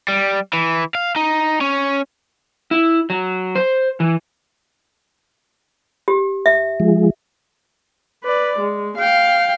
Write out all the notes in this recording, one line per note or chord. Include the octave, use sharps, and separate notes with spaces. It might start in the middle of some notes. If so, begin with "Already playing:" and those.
G3
E3
F5
D#4
C#4
E4
F#3
C5
E3
G4
E5
F3 G#3
B4 D5
G#3
F5 G5